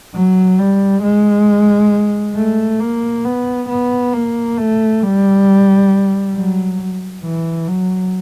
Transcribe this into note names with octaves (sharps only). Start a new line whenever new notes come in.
F#3
G3
G#3
A3
A#3
B3
B3
A#3
A3
G3
F#3
E3
F#3